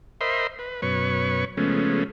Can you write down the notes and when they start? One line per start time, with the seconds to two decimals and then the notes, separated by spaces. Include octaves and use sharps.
0.21 A#4 C5 D#5 E5 B5 C6
0.59 B4
0.82 F#2 B2 B4 C#5 C#6
1.57 C#3 F3 G#3 A3 B3 C#4